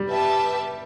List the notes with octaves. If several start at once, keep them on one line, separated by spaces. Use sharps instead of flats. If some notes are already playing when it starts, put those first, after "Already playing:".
Already playing: G3
G4 B4 E5 A5